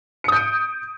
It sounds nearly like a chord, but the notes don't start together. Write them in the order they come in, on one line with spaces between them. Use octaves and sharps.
C#7 D#6 G6 D7